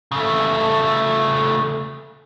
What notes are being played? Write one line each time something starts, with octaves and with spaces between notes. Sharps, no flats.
C#3 A3